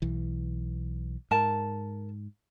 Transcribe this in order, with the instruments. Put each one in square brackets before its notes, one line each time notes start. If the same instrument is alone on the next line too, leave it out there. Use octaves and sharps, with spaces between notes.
[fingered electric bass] B1 E3
[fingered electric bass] G#2 [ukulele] A#4 A5